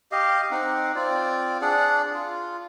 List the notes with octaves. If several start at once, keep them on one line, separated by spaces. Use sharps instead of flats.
G4 D#5 F5
C4 D#4 F#5
C4 F4 D5
D4 G#4 D5 F#5
F4